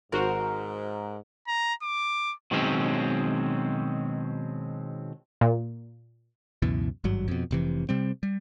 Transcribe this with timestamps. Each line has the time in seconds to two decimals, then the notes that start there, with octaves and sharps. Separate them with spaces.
0.12 G#1 G#2 F#4 A#4 C5
1.48 A#5
1.83 D6
2.51 B2 D#3 F#3 G#3 C4 C#4
5.41 A#2
6.62 C#2 F#2 B2 E3
7.04 G#1 G2 F#3
7.28 F2 B2
7.51 F1 C3 E3
7.89 C3 G3 C4
8.23 G3